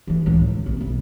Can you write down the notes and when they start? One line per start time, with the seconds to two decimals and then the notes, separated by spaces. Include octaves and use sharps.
0.07 D3 E3
0.26 C#2 A2
0.48 D#3
0.66 A#1 C4
0.81 B1